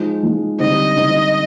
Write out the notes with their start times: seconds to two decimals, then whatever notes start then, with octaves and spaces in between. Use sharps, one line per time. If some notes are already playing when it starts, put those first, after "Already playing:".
Already playing: F3 G#3 D#4
0.23 F3 G#3 D#4
0.59 D3 G3 C4 D#4 D#5
0.96 D3 G3 C4 D#4